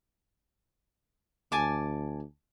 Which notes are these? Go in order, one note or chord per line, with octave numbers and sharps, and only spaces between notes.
D2 G#5 A5 D6